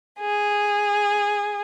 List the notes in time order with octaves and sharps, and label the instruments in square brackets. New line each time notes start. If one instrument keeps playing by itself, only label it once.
[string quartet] G#4